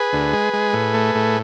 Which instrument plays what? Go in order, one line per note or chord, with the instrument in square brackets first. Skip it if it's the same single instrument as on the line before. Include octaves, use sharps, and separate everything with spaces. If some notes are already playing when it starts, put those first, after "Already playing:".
Already playing: [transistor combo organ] G#4 B4
D2
G#3
G#3
A2
A3
A2